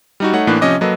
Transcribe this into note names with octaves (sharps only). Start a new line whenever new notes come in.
G3 D#4 F#4
A3 D#4 C#5 F#5
A2 E3 A#3 D4 F#6
C3 F3 C#4 D#5 D6
F#3 A#3 A4 B4 D#5